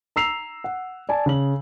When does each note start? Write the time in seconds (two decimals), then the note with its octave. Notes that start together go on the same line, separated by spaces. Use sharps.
0.16 A#5 E6 C7 F7
0.64 F#5
1.09 D5 G#5 A5
1.26 C#3 F#7